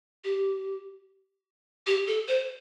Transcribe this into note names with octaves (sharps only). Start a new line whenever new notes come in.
G4
G4
A4
C5